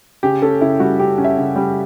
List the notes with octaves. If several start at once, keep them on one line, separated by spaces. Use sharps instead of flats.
C#3 G4
C#4 A4
C#3 E4
G3 F#4
C#3 G4
C#4
E5
C#3
G3